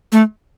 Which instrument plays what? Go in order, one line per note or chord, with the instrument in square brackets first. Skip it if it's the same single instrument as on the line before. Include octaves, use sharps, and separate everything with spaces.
[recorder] A3